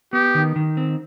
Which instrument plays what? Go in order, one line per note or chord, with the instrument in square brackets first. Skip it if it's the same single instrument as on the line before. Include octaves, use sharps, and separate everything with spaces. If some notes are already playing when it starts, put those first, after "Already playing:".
[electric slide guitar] B3 [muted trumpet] G4
[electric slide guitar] D#3
D#3
C4